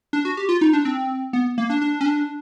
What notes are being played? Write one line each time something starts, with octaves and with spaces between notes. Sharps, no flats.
D4
F#4
G4
F4
D#4
D4
C4
B3
A#3
D4
D4
C#4
D4